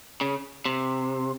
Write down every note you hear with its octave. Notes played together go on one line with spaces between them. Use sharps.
C#3
C3